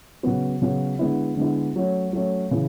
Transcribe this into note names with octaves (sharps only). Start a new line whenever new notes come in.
C#3 F#3 B3 F#4
C#3 F#3 B3 F#4
D3 G#3 B3 E4
D3 G#3 B3 E4
F#3 A3 C#4
F#3 A3 C#4
C#3 E3